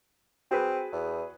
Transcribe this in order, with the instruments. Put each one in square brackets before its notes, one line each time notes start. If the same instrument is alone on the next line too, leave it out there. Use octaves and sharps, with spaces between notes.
[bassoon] C4 [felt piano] F#4 G#4 B4
[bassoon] E2